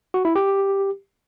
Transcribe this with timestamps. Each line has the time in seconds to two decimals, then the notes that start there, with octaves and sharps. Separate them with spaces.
0.14 F#4
0.25 E4
0.36 G4